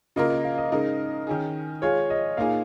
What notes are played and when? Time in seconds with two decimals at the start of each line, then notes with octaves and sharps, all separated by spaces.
0.16 C#3 A#3 F4 A#4 D#5
0.30 D#5
0.44 F5
0.58 D#5
0.72 C#3 G#3 D#4 A#4
1.27 D#3 C#4 G#4
1.82 G#3 F4 G#4 C#5
2.10 D#5
2.37 A#2 A#3 D#4 G#4 F5